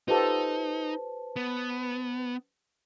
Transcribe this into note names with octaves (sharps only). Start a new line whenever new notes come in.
D#4 F4 G4 A4 B4 C5 A5
B3